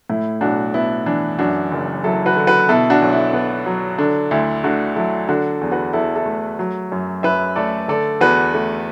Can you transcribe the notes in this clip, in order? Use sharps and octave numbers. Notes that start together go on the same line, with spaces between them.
A2 E4
B1 D4 F#4
B3 E4
E3 D4
F#2 D4 F#4
F#1
F#3 E4 A4
F#4 B4
D3
F#4 B4
B2 E4 A4
D4 F#4
B1
E4
B3
F#3
D3 D4
D2 E4
A3 D4 F#4
F#3 E4 A4
D3 D4 F#4
E2
F#4 B4
E2 E4 A4
E4 A4
A3
F#3
F#2
F#2 B4 E5
A3 A4 D5
D3 A4 D5
E2 F#4 B4
A3